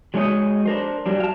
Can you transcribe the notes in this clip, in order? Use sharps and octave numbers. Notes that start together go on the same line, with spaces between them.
F#3 G#3 D4 D#4 C#5 D#5
D4 A#4 C5
G2 F#3 G3 D4
F5 A5